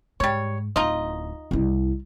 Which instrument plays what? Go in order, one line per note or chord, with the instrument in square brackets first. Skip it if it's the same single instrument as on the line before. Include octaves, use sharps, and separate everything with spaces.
[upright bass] G#2 [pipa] G3 C#5
[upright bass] D1 [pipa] D#4 F4 D#5
[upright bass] C2 E4